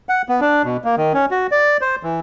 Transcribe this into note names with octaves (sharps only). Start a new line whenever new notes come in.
F#5
B3
D4
B2
A#3
D#3
C#4
F#4
D5
C5
E3